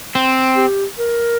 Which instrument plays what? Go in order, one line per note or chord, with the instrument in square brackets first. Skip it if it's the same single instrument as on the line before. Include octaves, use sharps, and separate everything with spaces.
[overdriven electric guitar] C4
[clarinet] G4
A#4